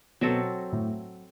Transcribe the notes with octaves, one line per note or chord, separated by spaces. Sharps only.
B2 F#3 C4 F#4 A4
A2